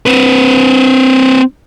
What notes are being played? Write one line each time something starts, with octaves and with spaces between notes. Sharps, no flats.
C4 B4